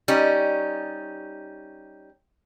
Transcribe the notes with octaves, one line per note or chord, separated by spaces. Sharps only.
G3 C#4 D#4